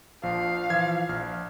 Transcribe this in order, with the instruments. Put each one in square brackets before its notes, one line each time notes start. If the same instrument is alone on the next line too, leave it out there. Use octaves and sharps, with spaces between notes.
[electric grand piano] A#1 F3 [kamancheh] F5
[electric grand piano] E3 F3 G#6
A#1 F6